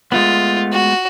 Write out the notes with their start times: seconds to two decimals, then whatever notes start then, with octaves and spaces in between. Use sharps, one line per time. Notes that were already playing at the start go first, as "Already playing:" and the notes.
0.12 G#3 A3 B3 F4
0.72 F#4